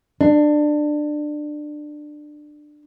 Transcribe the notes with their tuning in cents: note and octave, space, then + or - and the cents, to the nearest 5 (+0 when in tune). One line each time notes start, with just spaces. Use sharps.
D4 +20